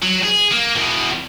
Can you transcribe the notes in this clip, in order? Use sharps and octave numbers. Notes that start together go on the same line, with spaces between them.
F#3
G#4
A#3
E2 B2